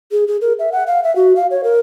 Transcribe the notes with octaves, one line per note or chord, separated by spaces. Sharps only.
G#4
G#4
A#4
E5
F#5
F5
E5
F#4
F5
C#5
A#4